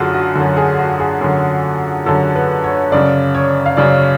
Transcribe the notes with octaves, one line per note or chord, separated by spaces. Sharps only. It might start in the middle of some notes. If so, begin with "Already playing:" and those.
Already playing: F#2 D3 F4 F#4 G#4
F#4
F#2 D3 F#4
G#4
F#4
G#4
F#2 D3
F#2 D3 A4
B4
C#5
F#2 C#3 D5
C#5
F5
F#2 C#3 D5